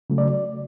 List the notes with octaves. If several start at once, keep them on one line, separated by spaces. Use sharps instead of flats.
C#3 F#3 A3
D5